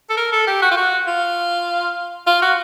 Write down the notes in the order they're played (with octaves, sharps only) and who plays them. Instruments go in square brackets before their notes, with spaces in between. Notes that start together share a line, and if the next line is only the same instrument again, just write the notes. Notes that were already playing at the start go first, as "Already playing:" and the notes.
[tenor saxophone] A4
A#4
A4
G4
F#4
F4
F#4
F4
F4
F#4